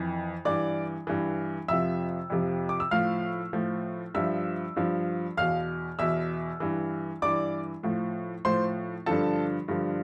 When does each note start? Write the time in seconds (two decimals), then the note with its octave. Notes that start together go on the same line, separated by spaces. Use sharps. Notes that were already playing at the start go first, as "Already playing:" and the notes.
Already playing: F2 E3
0.45 G2 E3 D5 D6
1.07 G2 E3
1.68 F2 C3 F3 E5 E6
2.30 F2 C3 F3
2.69 D6
2.80 E6
2.91 A2 F3 F5 F6
3.53 A2 F3
4.14 G2 F3 E5 E6
4.76 G2 F3
5.37 E2 B2 F5 F6
5.99 E2 B2 E5 E6
6.60 G2 E3
7.22 G2 E3 D5 D6
7.83 A2 F3
8.45 A2 F3 C5 C6
9.06 G2 D3 F3 A4 A5
9.68 G2 D3 F3